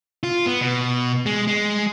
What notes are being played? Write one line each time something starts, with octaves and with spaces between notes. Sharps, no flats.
F4
B3
B2
G#3
G#3